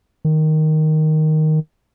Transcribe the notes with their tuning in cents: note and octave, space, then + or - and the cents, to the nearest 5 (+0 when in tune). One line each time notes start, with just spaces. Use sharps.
D#3 +0